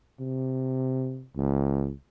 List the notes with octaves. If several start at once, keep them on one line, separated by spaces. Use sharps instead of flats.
C3
C#2